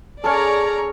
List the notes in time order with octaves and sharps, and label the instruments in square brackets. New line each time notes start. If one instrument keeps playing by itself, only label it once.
[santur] C#4 A4 [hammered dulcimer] G#4 [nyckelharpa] C#5 [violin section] D5 A#5